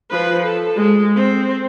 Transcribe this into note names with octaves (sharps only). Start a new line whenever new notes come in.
F3 B4
A4
G#3
C4